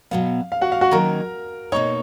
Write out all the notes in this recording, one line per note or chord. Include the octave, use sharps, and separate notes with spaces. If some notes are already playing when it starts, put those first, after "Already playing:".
B2 F#3 B3 F5
F5
F#4 F#5
F5
F#4 F#5
D#3 F#3 A#3 C#4 A#4 A#5
B2 A#3 D#4 C#5 C#6